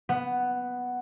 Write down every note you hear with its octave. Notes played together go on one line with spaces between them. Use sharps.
B3